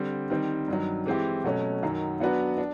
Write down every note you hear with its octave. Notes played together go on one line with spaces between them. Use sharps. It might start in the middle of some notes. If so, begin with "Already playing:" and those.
Already playing: D3 G3 C4
D#3 G3 C4
G2 D#3 F#3
E3 G#3 C4 E4 G4
B2 F#3 A3 C#4
F#2 D#3 F#3
F#3 B3 D4 F#4 B4
D4